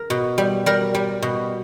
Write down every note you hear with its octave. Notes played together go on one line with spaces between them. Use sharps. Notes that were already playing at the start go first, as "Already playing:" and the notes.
Already playing: A#4
B2
G3
G3 A#4
G3
B2